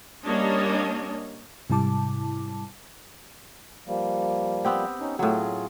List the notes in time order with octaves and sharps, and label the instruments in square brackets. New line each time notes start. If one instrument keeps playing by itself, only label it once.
[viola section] G3 A#3 C#4 D4 C#5 D#5
[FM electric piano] G#2 C3 G3 E4 A5 D6
[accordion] F3 G3 A#3
[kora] B3 C4 G4
[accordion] C#4 D#4
[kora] A2 F#3 [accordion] F4 G#4